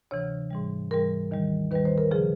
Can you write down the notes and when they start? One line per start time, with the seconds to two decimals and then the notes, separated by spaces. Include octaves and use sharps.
0.11 D2 C3 E3 C#5
0.51 G#2 E3 G3
0.91 G#2 E3 G3 A#4
1.31 D#2 D#3 G3
1.71 D#2 D#3 G3 B4
1.85 C5
1.98 A#4
2.11 C#3 F3 G#4